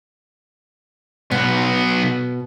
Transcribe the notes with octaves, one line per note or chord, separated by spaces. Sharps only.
B1 B2 B3